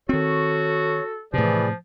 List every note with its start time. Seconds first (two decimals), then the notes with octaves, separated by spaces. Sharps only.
0.09 D#3 C4 F#4 A4 C#5
1.34 A2 C3 E3 F3 G#4 B4 D5